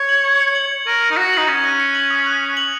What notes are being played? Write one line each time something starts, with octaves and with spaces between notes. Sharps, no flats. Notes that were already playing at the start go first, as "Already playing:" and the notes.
Already playing: C#5
F#7
G#6
C#7
F#7
G#6
A#4 C#6
A#6
D#4
F#4 C#7
D#4 F#7
C#4 C#6
F#6
C#7
F#7
D#6
F#6
C#7
F#7